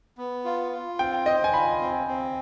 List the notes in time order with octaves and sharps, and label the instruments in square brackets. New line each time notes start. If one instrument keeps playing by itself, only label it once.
[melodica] B3
F4
F4
[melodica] C4 [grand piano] G5
[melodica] C5 [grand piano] D#5
[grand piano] G#5
[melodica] F4 [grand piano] B5
[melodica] C4
C4